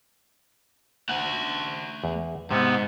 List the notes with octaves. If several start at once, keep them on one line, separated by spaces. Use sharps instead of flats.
A3 F#5
E2
G#2 C3 B3 C4